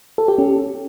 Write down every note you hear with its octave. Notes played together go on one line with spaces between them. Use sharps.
A4
G4
C#4